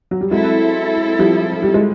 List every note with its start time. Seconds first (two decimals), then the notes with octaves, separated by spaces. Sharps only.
0.11 F#3
0.21 G3
0.31 F#3 G#3 C4 E4 A4
1.19 F3 G3
1.62 G3
1.74 G#3